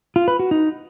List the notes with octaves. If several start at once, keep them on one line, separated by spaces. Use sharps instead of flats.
F4
B4
F#4
D#4